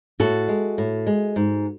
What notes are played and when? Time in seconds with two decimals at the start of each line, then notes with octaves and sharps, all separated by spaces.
0.20 A2 F#4 A4
0.48 G#3
0.78 A2
1.07 G#3
1.36 G#2